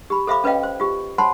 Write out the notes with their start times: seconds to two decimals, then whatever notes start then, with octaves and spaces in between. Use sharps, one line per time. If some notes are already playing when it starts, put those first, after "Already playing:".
0.10 G4 B5
0.27 A4 C5 E5 F5 B5 D6
0.44 C#4 B4 C#5 D#5 F5 G5
0.63 C5
0.80 F4 G4
1.18 C5 C#5 F#5 A5 B5 C6